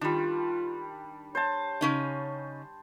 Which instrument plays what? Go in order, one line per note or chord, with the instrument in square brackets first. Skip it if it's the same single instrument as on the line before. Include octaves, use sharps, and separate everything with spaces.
[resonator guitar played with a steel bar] D#3 [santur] G3 D4 [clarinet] F4
[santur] C5 A5 [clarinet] C#5
[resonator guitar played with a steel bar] C#3 C#4 D#4